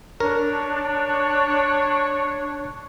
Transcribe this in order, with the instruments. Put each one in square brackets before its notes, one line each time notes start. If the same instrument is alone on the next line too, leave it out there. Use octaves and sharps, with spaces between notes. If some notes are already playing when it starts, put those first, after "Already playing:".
[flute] D4 [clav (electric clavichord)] A#4 [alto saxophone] C#5